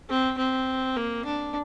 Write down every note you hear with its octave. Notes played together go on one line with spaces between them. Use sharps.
C4
C4
A#3
D4